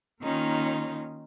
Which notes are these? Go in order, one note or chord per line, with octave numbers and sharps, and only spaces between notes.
D#3 A#3 C#4 D#4 F4